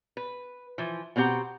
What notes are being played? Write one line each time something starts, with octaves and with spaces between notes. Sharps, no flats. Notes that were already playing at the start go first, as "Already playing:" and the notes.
B4
E3 F3
B2 B3 C4 G4 F#5 A#5